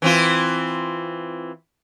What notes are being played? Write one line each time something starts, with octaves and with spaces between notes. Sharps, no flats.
E3 C4 F4